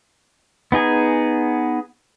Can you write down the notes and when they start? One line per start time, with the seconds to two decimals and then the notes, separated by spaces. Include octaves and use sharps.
0.72 B3 D#4 G#4 G#5